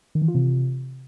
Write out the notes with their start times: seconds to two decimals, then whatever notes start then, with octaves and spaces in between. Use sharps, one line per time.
0.15 D#3
0.22 E3
0.28 F4
0.35 C3